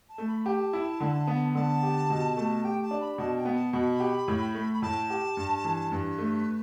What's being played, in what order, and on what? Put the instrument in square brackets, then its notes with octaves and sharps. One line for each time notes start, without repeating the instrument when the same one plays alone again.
[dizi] A5
[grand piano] A3
[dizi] B5
[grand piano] G4 [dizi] A5
[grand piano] E4
D3
B3
[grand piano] D3 [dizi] A5
[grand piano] G4
B2
A3
[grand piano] G4 [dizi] G5
[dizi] A5
[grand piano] D4
[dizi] B5
[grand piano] B2 [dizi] A5
[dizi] G5
[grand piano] B3
[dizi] A5
[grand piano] B2 [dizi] B5
[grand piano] G4
A2
A3
[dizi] B5
[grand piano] A2 [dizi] A5
[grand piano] G4
G2
E3
[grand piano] G2 [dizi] B4
[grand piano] A3